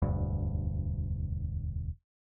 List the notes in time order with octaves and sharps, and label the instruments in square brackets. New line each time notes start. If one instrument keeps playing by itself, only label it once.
[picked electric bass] E1 D2 G2